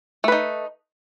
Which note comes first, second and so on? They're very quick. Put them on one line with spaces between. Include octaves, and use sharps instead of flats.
A3 B4 D#4